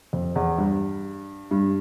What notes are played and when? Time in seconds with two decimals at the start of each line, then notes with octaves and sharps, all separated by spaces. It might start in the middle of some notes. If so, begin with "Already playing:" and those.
0.13 F2
0.36 E2
0.58 G2
1.51 G2